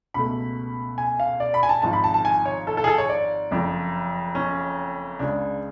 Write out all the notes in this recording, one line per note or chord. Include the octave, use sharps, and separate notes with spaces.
C#2 B2 A3 B5
G#5
F5
D5
B5
G#5
A5
G#1 G#2 F3 A5
B5
A5
A5
G#5
C#5
A4
A4
G#4
A4
C#5
D5
F#1 F2 F3
C#4
C#2 C#3 G#3 D4